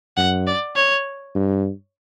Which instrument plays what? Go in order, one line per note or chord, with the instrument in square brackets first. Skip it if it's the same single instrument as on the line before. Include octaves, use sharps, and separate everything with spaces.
[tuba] F#2 [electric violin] F#5
[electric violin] D5
C#5
[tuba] G2